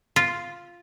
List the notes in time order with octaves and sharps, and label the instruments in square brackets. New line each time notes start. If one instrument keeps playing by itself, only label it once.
[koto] F4